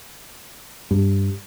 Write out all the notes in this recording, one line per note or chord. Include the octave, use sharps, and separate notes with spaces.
G2